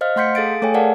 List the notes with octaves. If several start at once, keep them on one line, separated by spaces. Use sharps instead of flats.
C5 D#5 F5 F6
A3 F#5 C6 G6 B6 C#7
G#4 A4 F5 A6 D7
A3 A4 C#5 G5 G#5
G#4 A#4 D5 F5 F#5 A5